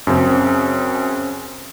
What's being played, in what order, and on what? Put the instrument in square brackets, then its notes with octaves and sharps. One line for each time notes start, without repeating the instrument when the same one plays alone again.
[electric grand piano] F#2 C#3 C4